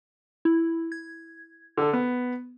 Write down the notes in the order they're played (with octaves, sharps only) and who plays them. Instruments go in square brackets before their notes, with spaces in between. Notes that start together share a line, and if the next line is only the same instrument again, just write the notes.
[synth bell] E4
G#6
[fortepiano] D3 A4
B3